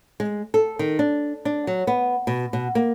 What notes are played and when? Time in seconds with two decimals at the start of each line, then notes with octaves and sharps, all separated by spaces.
0.20 G#3
0.54 A4
0.79 D#3
0.99 D4
1.45 D4
1.67 F#3
1.87 B3
2.27 B2
2.53 B2
2.75 A#3